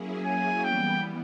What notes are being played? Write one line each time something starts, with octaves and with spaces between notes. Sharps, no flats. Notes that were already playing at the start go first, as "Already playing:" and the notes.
Already playing: F#3 A#3 C#4 E4 G#4
G#5
E3 G3 B3 G5